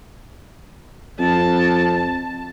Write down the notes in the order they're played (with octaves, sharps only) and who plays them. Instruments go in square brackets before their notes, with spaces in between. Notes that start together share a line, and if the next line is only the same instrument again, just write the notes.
[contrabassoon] F2 [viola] A5